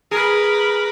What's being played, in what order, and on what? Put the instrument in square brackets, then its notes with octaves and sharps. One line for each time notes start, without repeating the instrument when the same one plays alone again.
[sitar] G#4 [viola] A#4 B4